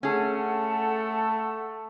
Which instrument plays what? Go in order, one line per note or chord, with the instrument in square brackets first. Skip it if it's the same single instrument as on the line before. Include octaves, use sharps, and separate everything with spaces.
[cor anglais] A3 [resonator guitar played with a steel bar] C#4 G#4 [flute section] A4 F#5 A5